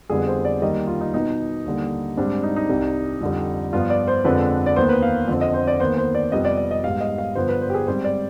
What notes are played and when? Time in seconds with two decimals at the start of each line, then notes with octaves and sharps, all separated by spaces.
0.10 F2 D3 G3 B3 G#4
0.27 C5
0.45 D5
0.62 D#2 D#3 G3 D#5
0.87 F4
1.01 D#4
1.13 B2 B3 D#4
1.66 D#2 D3 G3
2.17 G#2 G3 C4 D4
2.43 D#4
2.56 D#4
2.69 C2 C3 G3
3.21 F2 D3 G3
3.73 G2 F3 B3 F4
3.90 D5
4.08 C5
4.24 F2 D3 G#3 C4 B4
4.66 D5
4.76 D#2 D#3 B3 C5
4.89 B4
5.03 F5
5.28 F2 D3 F3 C4
5.41 D#5
5.54 C5
5.67 D5
5.80 D#2 D#3 B3 C5
5.97 C5
6.15 D5
6.32 F2 C3 G3 B3 D#5
6.45 D5
6.57 D5
6.71 D#5
6.83 G#2 G3 B3 F5
7.00 D#5
7.18 F5
7.35 G2 D3 F3 B3 C5
7.49 B4
7.61 C5
7.70 G4
7.74 G#4
7.87 G#2 G3 C4 C5
8.04 D5